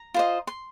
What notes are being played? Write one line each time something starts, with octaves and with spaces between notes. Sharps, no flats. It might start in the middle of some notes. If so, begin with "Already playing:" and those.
Already playing: A#5
F4 C5 D#5
C6